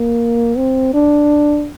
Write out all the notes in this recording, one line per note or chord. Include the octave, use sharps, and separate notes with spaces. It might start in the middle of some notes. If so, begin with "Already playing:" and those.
Already playing: A#3
C4
D4